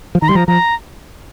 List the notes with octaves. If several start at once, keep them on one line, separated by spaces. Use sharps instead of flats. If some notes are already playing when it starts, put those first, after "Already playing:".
F3
D#3 A#5
G3 C6
F3 A#5
F3 A#5